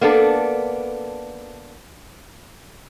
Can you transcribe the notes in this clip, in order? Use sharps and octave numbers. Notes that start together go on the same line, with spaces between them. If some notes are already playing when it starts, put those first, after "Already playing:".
A#3 B3 D4 A4